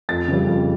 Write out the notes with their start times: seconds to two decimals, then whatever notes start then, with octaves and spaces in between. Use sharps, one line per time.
0.09 F2 A6
0.28 C#3 G3
0.47 F2